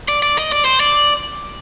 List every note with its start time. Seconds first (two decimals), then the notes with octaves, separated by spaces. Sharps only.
0.08 D5
0.22 D5
0.38 D#5
0.52 D5
0.65 C5
0.80 D5